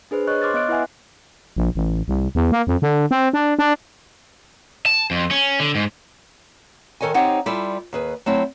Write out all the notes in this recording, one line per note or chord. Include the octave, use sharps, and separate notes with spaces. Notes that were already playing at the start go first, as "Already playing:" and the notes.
D4 G#4 B4 C5
C#5 D#5 C#6 F#6
C6 D6 F6 A6
B3 D#5 F#6 D7
E4 B4 E5 F#5 G#5
A#1
A1
C2
E2
A#3
F2
D3
C4
D4
D4
A5
F2
C#4
D3
G#2
D#3 A4 C#5 D#5 G#5
C4 D#4 G4 C5 C#5 F#5
G3 E4 F4 A4 D5
D#2 G#4 B4
F#3 A3 C4 E4